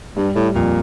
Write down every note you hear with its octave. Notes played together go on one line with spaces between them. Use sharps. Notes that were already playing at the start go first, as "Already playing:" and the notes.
G2 G3
A2 G3
F2 A#2